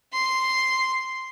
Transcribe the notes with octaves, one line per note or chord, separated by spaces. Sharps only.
C6